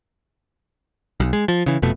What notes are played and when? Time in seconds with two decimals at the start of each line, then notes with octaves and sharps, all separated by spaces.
1.20 B1
1.33 G#3
1.48 F3
1.66 C#3 E3
1.82 F1 F2 B2 A3